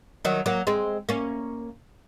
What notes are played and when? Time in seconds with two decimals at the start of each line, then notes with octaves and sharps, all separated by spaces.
0.25 D#3 F#3
0.46 F#3 A#3
0.67 G#3 C4
1.09 A#3 C#4